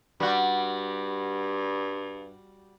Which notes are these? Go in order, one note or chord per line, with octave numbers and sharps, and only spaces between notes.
G2 G3 F#4